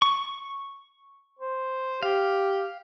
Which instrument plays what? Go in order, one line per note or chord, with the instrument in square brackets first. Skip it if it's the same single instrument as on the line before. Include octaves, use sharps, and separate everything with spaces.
[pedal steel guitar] C#6
[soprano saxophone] C5
[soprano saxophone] G4 [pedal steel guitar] F5